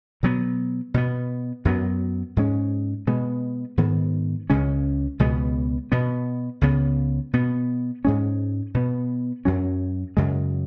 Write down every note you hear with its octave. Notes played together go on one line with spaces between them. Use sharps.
B2 F#3 B3
B2 B3
F#2 F#3 B3
G#2 G#3 C#4
B2 G#3 B3
G#2 D#3 B3
C#2 C#3 G#3 C#4
C#2 B2 G#3 B3
B2 B3
C#2 C#3 B3
B2 B3
G#2 G#3 C#4
B2 B3
F#2 F#3 C#4
F#2 C#3 G#3